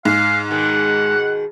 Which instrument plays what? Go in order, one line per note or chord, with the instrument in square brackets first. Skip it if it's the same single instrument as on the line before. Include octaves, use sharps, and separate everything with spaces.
[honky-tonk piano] G#2 [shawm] F5
[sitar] B2 D#3 G#3 [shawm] F#5